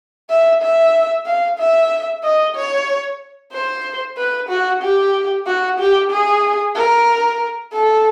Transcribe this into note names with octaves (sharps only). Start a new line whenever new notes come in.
E5
E5
F5
E5
D#5
C#5
C5
B4
F#4
G4
F#4
G4
G#4
A#4
A4